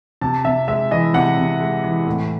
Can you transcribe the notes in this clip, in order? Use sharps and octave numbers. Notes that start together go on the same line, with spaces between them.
C3 A5
C3 E5
G#3 E5
E3 D#5
C3 F#5
C3
G#3
E3
A2